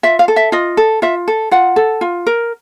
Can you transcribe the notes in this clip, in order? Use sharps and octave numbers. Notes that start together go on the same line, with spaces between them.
F4 E5
F5
A4
E5
F4 D#5
A4
F4 E5
A4
F4 F#5
A4
F4
A#4